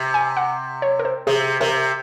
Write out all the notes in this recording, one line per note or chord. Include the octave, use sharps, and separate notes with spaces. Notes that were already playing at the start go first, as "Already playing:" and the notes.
Already playing: C3
G#5
F#5
C#5
A#4
C5
C3 G#4
C3 A#4